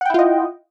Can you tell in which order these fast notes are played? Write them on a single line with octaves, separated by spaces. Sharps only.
F#5 G5 E4 F4 D#5